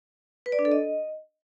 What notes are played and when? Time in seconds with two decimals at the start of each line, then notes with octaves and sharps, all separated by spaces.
0.46 B4
0.52 D5
0.59 D4
0.65 A4
0.72 D#5